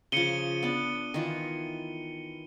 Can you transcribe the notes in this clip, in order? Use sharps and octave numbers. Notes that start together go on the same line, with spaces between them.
C#3 F3 C#7 D#7 G7
B3 D4
D#3 E3 F4